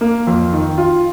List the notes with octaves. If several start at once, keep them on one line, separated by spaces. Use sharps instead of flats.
A#3
F2
D#3
F4